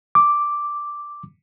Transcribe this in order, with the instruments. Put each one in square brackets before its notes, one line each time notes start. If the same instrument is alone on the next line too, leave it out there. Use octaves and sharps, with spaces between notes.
[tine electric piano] D6